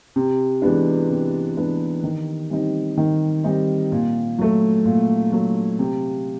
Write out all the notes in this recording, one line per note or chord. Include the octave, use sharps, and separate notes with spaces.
C3
E3 G#3 B3 D4
C3
E3 G#3 B3 D4
D#3
G3 C4 D#4
D#3
G3 C4 D#4
A#2
F#3 A3
A#2
F#3 A3
C3